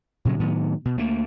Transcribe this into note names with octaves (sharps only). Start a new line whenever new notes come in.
A#2 C#3 F3 F#3
A2 D#3 F#3 B3
B2
D2 A3 A#3